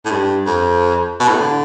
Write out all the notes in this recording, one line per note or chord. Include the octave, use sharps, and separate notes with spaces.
A2
G2
F2
B2
A2
D3